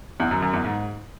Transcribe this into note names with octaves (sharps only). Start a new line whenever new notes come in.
E2
F#2
F#2
E2
G#2